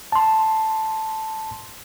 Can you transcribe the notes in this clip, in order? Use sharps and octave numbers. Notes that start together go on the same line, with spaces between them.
A5 C6